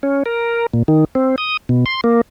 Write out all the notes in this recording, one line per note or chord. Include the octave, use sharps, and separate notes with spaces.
C#4
A#4
A#2
D#3
C4
D#6
B2
C6
A#3